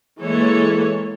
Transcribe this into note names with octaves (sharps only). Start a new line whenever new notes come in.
E3 G#3 A#3 A4 C#5